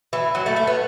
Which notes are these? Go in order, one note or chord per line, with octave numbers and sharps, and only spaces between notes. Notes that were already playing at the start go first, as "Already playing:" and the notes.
E3
F#3
A3
A3
B3